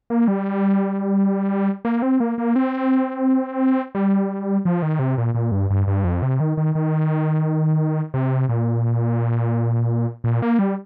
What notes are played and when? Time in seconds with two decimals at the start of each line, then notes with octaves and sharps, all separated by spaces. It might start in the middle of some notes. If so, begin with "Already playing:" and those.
0.10 A#3
0.28 G3
1.85 A#3
2.02 C4
2.20 A#3
2.38 A#3
2.56 C4
3.95 G3
4.65 F3
4.82 D#3
4.99 C3
5.18 A#2
5.35 A#2
5.52 G2
5.70 G2
5.87 G2
6.04 F2
6.22 C3
6.40 D#3
6.57 D#3
6.75 D#3
8.14 C3
8.49 A#2
10.24 A#2
10.42 A#3
10.59 G3